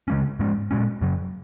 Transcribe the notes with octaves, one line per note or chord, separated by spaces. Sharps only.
C#3 G#3 C#4
G#2 G#3 C#4
A#2 G#3 C#4
F#2 C#3 F#3